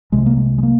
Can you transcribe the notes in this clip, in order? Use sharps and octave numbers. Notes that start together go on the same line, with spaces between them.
C2 C3 G#3
A#3
G#3
G#3
A#3